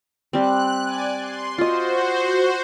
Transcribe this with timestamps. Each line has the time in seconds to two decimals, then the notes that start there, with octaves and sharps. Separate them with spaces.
0.33 G3 C4 F#6
0.81 D5 G#5
1.18 C6
1.58 F4 F#4 C5 D#5